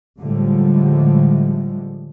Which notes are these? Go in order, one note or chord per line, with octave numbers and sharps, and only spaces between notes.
A2 D3 F3 G3 G#3